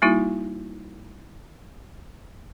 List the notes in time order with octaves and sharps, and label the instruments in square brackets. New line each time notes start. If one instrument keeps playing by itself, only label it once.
[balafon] G3 A#3 D#4 E4 F#4